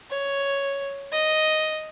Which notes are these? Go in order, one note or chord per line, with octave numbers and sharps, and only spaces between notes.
C#5
D#5